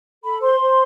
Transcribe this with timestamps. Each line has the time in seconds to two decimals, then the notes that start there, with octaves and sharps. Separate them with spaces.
0.23 A4 B5
0.42 C5 C6
0.60 C5